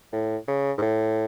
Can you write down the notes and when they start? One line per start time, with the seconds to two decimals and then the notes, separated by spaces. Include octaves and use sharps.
0.13 A2
0.48 C#3
0.78 G#2
0.82 A2